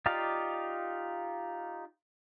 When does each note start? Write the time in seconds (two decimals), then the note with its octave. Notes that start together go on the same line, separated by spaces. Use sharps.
0.06 D#4 F4 G4 D5 F5